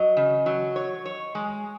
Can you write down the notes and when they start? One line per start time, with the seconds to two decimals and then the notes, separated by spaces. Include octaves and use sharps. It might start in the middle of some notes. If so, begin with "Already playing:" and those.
Already playing: F#3 D#5
0.17 C#3
0.46 F#3
0.76 C#5
1.06 C#5
1.35 G#3